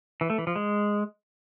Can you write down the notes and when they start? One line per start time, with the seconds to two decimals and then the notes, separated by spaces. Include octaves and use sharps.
0.21 E3
0.30 A3
0.38 E3
0.47 F3
0.56 G#3